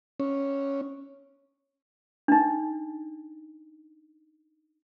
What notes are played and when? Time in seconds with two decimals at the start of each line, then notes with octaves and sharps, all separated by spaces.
0.20 C#4
2.28 D4 D#4